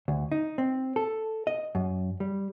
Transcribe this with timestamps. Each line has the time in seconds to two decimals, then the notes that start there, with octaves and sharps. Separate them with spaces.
0.08 D2
0.32 D#4
0.58 C4
0.96 A4
1.47 D#5
1.75 F#2
2.20 G3